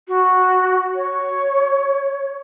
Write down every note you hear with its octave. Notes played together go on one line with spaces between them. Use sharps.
F#4
C#5